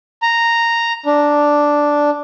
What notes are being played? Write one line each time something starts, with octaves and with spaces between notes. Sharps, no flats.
A#5
D4